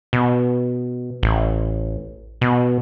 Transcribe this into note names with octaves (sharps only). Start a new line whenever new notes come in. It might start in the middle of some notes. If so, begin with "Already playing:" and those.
B2
A1
B2